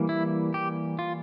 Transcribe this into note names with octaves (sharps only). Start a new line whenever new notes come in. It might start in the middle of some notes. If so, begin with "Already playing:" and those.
Already playing: E3 G3 A#3
E4
G4
F4